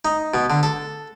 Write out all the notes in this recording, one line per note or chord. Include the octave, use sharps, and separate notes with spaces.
D#4
B2
D3
A4